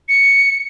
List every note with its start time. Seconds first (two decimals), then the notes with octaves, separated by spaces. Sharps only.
0.09 C#7